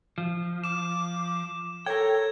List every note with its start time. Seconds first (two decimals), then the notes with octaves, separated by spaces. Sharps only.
0.18 F3
0.64 D6 E7
1.86 A4 A#4 C#5 G5 G#6